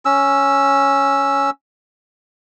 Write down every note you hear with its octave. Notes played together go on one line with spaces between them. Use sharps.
C#4 E6